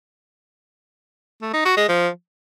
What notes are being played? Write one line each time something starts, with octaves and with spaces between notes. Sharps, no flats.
A3
D#4
F#4
G#3
F3